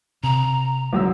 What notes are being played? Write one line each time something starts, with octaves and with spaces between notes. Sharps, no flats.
C3 A#5
C2 F#2 E6